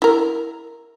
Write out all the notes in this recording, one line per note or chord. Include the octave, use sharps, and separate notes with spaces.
E4 A#4